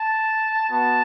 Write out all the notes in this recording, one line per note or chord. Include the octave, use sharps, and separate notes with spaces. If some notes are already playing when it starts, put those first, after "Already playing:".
Already playing: A5
B3 F#4 A5